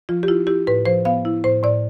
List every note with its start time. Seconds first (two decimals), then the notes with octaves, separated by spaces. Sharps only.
0.09 F3 F4
0.23 G4
0.28 E4 F4
0.47 E4 G4
0.67 A2 B4
0.86 F3 C5
1.05 B3 F5
1.25 E4
1.44 A2 C5
1.63 A2 D5